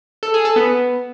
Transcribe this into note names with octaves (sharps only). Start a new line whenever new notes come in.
A4
G#4
A4
B3